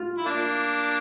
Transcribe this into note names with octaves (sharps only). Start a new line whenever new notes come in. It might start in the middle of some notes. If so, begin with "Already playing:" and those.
Already playing: F4
E4
A#3 D4